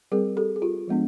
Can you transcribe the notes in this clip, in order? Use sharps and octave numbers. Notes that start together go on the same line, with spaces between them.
G3 C4 G#4 A#4
G4 A4
G#4
F4 G4
F3 G#3 B3 D4